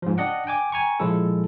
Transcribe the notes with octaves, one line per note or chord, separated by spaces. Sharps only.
G#2 F3
D4 D5 D#5 F#5 G5
G5 G#5 D6
G5 G#5 A#5 C#6
A#2 F3 G#3 E4 A4